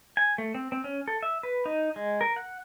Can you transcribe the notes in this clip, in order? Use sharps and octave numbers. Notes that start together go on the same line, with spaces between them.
G#5
A3
C4
C4
C#4
A4
E5
B4
D#4
G#3
A#4
F#5